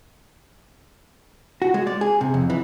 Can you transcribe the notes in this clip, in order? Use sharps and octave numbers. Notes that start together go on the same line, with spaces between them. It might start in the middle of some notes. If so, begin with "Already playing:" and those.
F#4
G#3
D5
G#4
C3
F2
E3